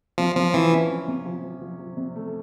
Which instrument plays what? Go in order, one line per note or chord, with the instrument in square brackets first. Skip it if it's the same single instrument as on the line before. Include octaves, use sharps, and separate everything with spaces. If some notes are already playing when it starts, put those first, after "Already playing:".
[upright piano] C3 [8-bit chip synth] F3
[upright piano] C3 [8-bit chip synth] F3
[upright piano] C3 [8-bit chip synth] E3
[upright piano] C#4
F3
C3
F3
F3
F3
F3
C3
A3